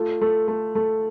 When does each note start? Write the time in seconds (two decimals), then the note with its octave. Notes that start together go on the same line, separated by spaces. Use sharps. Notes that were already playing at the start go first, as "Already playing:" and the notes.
Already playing: A3 F4
0.21 A3
0.48 A3
0.75 A3